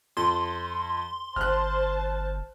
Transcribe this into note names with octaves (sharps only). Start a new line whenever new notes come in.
F2 C6
G1 C5 A5 F6 F#6